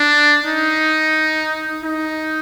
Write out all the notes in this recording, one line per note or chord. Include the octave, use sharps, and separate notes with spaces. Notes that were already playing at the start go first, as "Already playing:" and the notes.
Already playing: D4
D#4
D#4